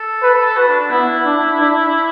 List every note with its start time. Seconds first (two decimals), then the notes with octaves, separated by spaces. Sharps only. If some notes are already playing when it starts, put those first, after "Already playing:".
Already playing: A4
0.22 B4
0.46 A4
0.57 F#4 B4
0.68 D4
0.80 D4
0.91 B3 E4
1.25 D4
1.59 D4